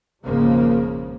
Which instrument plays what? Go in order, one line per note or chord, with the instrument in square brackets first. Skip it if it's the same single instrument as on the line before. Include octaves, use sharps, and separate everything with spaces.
[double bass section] G#1 F2 C#3 F3 G#3 A#3